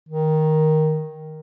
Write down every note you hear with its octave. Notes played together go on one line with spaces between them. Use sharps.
D#3